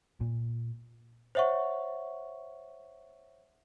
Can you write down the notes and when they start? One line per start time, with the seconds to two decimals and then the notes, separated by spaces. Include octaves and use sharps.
0.21 A#2
1.35 C5 C#5 E5 F#5 C#6